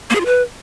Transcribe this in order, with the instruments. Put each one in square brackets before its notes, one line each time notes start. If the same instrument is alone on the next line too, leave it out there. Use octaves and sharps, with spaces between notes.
[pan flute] A#3
G#4
F4
B4